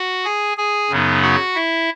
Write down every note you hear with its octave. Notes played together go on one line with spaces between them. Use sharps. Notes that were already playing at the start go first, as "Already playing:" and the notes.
Already playing: F#4 F#5
G#4 G#5
G#4 G#5
F#2 C#3 F#3 B3 D#4
F#4 F#5
E4 E5